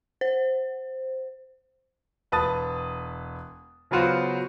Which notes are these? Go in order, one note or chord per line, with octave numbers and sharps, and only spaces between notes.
C5
E1 B4 A5 D#6 A6
C#3 F#3 B3 F4 F#4 C5